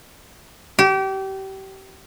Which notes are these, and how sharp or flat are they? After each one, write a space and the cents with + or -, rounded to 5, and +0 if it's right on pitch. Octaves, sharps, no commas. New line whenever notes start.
G4 -30